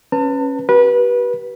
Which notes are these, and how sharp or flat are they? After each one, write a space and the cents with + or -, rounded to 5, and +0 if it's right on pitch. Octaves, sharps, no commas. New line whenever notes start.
C#4 -15 B4 +0 A5 +40
G4 -40 B4 -25